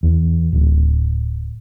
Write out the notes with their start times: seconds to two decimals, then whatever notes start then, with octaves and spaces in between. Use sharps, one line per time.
0.03 E2
0.53 D1